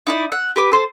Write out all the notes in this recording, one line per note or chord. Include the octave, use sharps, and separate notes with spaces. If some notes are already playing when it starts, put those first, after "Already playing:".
D#4 E4 D5
F#5 E6
G4 B4 D6
A4 C5